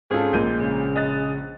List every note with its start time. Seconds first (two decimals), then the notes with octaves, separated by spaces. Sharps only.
0.11 G#2 C4 C#4 F4 G#4 A4
0.33 A#1 A#2 G#3 A#3 G6 D#7
0.59 C#3
0.96 D#5 F#6 A6